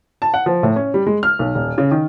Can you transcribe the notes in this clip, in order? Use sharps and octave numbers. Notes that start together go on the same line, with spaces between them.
A5
F#5
F3
A2
C#4
G3
G#3
F6
B1
D#1
C#3
D#3